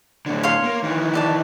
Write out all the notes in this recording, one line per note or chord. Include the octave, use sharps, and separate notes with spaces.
A2 D3
C#5 F5 C6
A#3
D#3 E3
G4 D5 A5